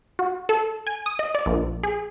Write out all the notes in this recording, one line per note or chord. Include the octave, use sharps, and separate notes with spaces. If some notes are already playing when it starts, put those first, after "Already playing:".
F#4
A4
G#5
D#6
D#5
D5
A#1
G#4